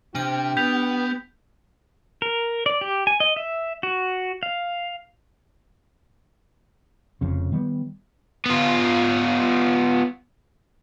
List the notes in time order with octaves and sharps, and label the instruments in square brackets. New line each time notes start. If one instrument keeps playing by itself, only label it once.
[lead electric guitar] C3 [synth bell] D4 F6 [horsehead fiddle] G4 G5
[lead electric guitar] B3 [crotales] G6 B6 F7
[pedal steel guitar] A#4
D5
G4
G#5
D#5
E5
F#4
F5
[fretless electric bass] F1 F2 C#3
D#3 G3 B3
[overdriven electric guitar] B3 F4